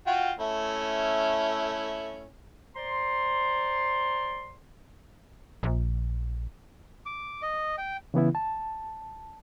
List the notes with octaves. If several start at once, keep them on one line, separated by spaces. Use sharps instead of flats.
F4 F#4 G5
A3 C#4 E4
C5 D5 A#5 C6
A#1
D6
D#5
G5
C#3 E3 B3 E4
A5